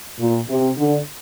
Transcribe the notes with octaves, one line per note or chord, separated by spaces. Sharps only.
A#2
C3
D3